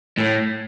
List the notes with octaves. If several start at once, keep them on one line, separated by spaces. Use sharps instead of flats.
A2